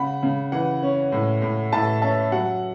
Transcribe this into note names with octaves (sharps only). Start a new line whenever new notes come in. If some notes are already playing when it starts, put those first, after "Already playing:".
Already playing: C#3 F#5 B5
C#3
E3 F#5
C#4
A2
A2
A2 E5 A5
C#4 E5 A5
F#3 F#5